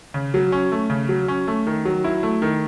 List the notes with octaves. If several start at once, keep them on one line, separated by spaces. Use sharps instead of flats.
C#3
F#3
C#4
A3
C#3
F#3
C#4
A3
D#3
F#3
E4
A3
D#3